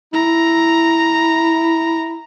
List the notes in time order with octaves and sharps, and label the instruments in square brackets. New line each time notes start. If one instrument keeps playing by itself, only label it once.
[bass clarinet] E4 [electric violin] A#5